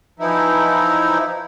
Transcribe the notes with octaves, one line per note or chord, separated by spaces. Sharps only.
E3 F3 D#4 E4